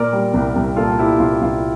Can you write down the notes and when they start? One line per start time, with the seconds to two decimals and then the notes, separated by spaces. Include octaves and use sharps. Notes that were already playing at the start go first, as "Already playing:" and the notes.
Already playing: A#2 A#4 D5
0.13 G3
0.34 C2
0.56 C2
0.77 A#2 F4 A4
0.99 G3 E4 G4
1.20 C2 F4
1.41 C2 F4